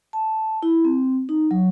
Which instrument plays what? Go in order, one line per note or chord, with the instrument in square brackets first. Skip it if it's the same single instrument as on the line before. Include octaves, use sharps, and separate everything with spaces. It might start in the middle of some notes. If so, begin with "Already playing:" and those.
[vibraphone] A5
E4
C4
D#4
F#3